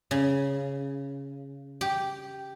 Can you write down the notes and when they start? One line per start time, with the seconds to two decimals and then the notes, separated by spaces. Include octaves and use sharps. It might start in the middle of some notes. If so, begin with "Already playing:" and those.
0.11 C#3
1.81 G4